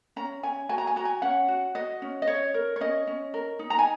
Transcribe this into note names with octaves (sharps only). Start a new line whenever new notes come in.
C#4 A#5
C#4 G#5
F#4 G#5
A#5
G#5
F#4 A#5
G#5
C#4 F#5
F#4
F#4 D#5
C#4
D#5
C#4 C#5
A#4
C#5
C#4 D#5
C#4
A#4
D#4
A#5
G#5